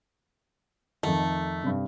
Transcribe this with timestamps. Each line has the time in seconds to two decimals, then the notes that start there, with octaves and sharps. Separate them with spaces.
1.03 F2 D#3 A3
1.64 G2 C3